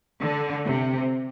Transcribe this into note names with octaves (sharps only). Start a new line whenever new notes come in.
D3
C3